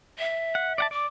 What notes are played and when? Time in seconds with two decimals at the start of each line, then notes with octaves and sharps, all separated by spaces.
0.18 E5
0.55 F#5
0.78 D5 F#5 A5
0.91 D5 D6